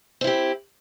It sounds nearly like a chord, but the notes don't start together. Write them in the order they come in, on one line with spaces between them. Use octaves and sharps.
C4 E4 G4